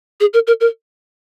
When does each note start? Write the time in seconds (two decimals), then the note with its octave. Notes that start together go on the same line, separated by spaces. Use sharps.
0.20 G#4
0.34 A#4
0.47 A#4
0.61 A#4